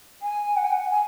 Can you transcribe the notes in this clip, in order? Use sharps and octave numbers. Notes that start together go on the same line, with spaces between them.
G#5
F#5
G#5
F#5
G#5